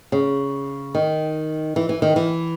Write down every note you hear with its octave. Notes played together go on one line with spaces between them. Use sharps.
C#3
D#3
E3
E3
D#3
E3